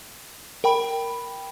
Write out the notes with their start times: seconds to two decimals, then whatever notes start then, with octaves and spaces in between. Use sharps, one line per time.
0.64 A#4 G5 B5